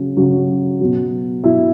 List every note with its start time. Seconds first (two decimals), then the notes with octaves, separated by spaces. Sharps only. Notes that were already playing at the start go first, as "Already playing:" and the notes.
Already playing: C#3 F#3
0.17 C#3 F#3
0.80 B2 F#3
1.44 B2 F#3 E4